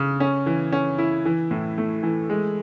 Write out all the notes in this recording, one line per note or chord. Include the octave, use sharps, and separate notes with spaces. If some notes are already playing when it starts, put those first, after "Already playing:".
Already playing: C#3
C#4
E3
C#4
E4
E3
A2
A3
E3
G#3